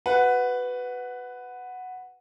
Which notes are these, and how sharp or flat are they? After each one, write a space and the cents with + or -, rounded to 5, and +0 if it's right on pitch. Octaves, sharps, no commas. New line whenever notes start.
F#4 +15 B4 +10 F#5 -5